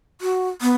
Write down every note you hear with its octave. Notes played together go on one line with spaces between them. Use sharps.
F#4
B3